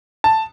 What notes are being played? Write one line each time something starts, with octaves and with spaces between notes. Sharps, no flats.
A5